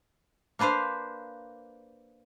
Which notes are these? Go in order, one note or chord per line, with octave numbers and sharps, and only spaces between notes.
A#3 D4 B4 C5 F5